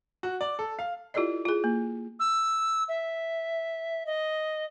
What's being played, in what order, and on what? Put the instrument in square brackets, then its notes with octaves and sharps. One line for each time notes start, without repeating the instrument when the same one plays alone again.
[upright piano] F#4
D5
A4
F5
[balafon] E4 F4 G4 A4 D5 D#5
F4 G#4
A#3
[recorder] E6
E5
D#5